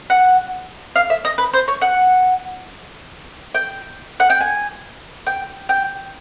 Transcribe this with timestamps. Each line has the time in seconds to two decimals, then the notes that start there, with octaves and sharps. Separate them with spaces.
0.10 F#5
0.96 F5
1.10 E5
1.25 D#5
1.38 B4
1.53 C5
1.68 C#5
1.81 F#5
3.55 G5
4.20 F#5
4.30 G5
4.41 G#5
5.27 G5
5.69 G5